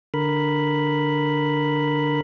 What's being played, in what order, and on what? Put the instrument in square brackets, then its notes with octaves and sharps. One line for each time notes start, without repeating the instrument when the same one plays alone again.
[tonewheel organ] D3 A#4 B5